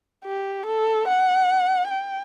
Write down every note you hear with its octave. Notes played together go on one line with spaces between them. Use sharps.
G4
A4
F#5
G5